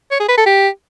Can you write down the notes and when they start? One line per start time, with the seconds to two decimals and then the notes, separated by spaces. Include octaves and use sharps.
0.11 C#5
0.20 G#4
0.29 B4
0.37 A4
0.46 G4